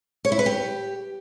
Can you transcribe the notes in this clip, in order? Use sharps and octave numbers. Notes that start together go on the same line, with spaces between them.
C#5
E4
B4
G4